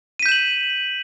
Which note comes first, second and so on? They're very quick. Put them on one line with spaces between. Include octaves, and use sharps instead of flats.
D#7 B6 G6 E7 F#7